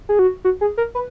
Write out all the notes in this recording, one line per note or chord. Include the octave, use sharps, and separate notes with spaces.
G#4
F#4
F#4
G#4
A#4
B4